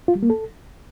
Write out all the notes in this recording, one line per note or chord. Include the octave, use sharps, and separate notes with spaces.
F4
G3
A#3
A4